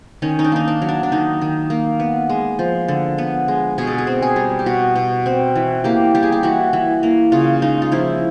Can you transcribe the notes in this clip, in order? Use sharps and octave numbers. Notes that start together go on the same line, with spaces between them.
D#3 C#4
D#4
D4
A#3 D#4
D4
F#3
D4
D4
D#3 D#4
D#3
A#3
B3
G#3
F3
D3
B3
G#3
B2 G#4
A4
G#4
C4
G#4
G3
G4
B2 F#4
B2
C4
E3
A#3 G4
G3 G4
G#4
G4
E3 F#4
E3
A#3
C#3 F4
G#3 D#4
F4
F3 E4